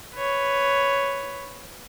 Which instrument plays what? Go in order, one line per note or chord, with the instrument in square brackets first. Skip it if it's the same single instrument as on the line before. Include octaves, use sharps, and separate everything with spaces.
[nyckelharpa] B4 C#5